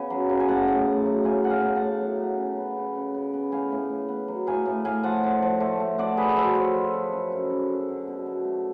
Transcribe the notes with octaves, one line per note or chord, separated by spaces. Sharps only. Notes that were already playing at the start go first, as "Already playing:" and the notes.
Already playing: C#3 B3 C#5 G#5
F#3
C#3
G#5
A2 F#5 A5
A2
A2
F#3
A2 F5 G#5
F#3 F#5
F5 G#5
A2
F#5 A5
A2
F#3
C#3
C#3
B3
C#3
C#3
C#3
B3
A2 F5 G#5
A2
A2
B3
F#3
A2 F5 G#5
A2
A2 F5 G#5
F3 F#5 A5
D3
F3
A3
A3
A3 D5 F#5
D3 G#4 B4
F3 F#4 A4
F3 A4 C#5
F3
D3
F#2
F#2
F#2
F#2
D3
B2
B2
A3